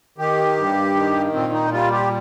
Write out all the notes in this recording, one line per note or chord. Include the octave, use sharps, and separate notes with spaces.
D#3 G4
G2
D#3
A#2 C4
D#4
G3 F4
G4